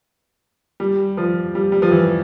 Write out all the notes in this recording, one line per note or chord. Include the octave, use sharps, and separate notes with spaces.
G3
F3
G3
G3
F3
E3